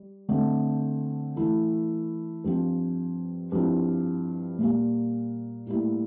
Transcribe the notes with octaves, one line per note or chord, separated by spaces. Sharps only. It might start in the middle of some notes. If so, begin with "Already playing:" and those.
Already playing: G3
D3 A3 C4
E3 A3 E4
G2 F3 C4 F4
G2 F3 C4 E4
A#2 G3 A#3
A2 G3 A#3 E4